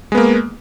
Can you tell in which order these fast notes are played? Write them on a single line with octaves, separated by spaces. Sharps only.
G#3 B3 A#3